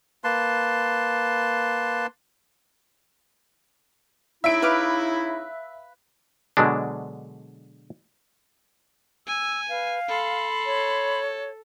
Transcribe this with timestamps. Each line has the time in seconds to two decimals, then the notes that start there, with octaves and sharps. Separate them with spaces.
0.24 A#3 B4 A5 C6
4.44 C#3 D#4 E4 E5 D7
4.62 B4 F5 D6
6.57 B2 D3 F#3 G#3 D4
9.28 G#5 E6
9.69 B4 F5
10.08 A4 B5 C6
10.66 C#5